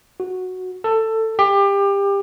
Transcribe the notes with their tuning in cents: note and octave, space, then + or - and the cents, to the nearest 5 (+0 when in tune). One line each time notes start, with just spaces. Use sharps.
F#4 -5
A4 +15
G4 +25